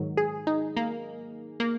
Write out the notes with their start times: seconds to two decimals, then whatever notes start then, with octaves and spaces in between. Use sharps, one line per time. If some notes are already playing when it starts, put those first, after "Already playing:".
Already playing: G#2 D#3 F#3
0.17 G#4
0.47 D#4
0.77 A#3
1.60 A#3